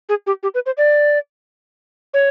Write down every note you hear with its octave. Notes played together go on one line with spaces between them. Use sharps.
G#4
G4
G4
B4
C5
D5
C#5